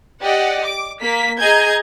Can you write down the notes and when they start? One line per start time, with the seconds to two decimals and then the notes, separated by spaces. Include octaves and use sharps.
0.21 G4 D5 D#5 F#5
0.64 D6
1.00 A#3 B6
1.39 G#4 D#5 A#5 G6 G#6